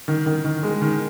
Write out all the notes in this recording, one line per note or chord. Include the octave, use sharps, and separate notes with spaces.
D#3
D#3
D#3
G#3
D#3